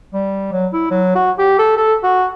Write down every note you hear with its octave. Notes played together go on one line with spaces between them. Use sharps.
G3
F#3
E4
F#3
F#4
G4
A4
A4
F#4